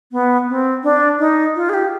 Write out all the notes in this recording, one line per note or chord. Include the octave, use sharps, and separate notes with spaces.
B3
C4
D4
D#4
F4
G#4
G4